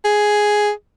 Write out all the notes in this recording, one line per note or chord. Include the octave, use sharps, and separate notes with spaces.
G#4